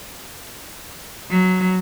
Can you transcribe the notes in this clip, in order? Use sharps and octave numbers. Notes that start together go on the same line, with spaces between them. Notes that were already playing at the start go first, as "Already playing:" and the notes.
F#3